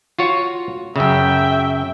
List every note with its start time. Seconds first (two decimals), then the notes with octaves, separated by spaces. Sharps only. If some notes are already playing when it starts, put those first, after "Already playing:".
0.19 F4 F#4 C#5
0.96 F#2 C#3 E5 G5